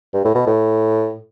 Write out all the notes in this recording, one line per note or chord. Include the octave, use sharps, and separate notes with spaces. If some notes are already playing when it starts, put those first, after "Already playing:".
G2
A2
B2
A2